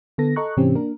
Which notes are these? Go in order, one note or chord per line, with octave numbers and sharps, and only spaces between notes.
D3 B3 A4 A#6
A4 D#5 A#5 C#6 F#6
G#2 C3 E3 C4 C#4 G4
A#3 D4 A#4